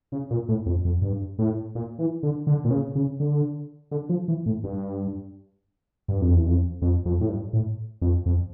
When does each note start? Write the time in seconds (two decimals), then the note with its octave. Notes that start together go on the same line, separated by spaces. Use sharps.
0.12 C#3
0.31 A#2
0.49 A2
0.66 F2
0.85 F2
1.02 G2
1.39 A2
1.75 A#2
1.99 E3
2.23 D3
2.47 D3
2.65 A#2
2.71 C#3
2.95 C#3
3.20 D3
3.91 D3
4.09 F3
4.28 E3
4.46 A2
4.64 G2
6.08 G2
6.22 F2
6.35 E2
6.46 F2
6.82 F2
7.05 F2
7.21 A2
7.29 G2
7.53 A2
8.01 F2
8.26 F2